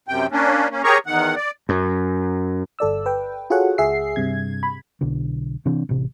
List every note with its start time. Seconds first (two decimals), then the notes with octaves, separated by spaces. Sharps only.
0.08 F#2 C3 G5
0.31 A#3 C#4 D4
0.71 A#3 C#4
0.84 G4 G#4 A#4 C#5 A#5 C#6
1.06 E2 D#3 F#5
1.36 D5
1.69 F#2
2.79 G1 A4 D5 E6
3.06 B4 G5
3.50 F4 F#4 G#4 A4 C#5 F#5
3.78 C#2 G#4 E5 C7
4.16 G2 C3 G#6
4.63 B5
5.01 B1 D3
5.66 C3 E3 C4 D4
5.89 A1 C3